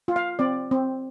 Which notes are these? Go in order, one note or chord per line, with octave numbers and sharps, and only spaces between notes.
F4
F5
C4 D5
C4